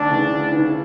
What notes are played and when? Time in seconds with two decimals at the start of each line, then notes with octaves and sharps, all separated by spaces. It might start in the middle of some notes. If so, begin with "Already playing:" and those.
Already playing: D2 D4
0.09 C#3 E3
0.30 D2
0.52 C#3 E3